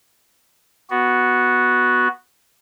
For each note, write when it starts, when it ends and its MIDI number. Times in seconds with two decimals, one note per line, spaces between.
0.90 2.08 59
0.90 2.08 66